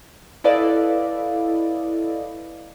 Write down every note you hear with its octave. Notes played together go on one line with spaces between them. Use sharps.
E4 A4 B4 D5 D#5 F5